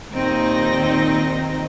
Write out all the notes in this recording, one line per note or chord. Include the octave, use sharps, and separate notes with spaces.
D#2 A#2 D#3 C4 D#4 A#6